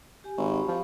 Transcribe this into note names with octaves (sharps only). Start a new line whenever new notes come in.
G4 G#5
G#1 G4 B5 C#6
F3